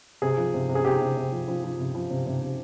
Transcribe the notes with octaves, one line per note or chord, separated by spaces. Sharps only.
C3 G#4
F3
C3
C3
G#4
C3 G4
C3
C3
F3
F3
F3
C3
F3
C3
C3
C3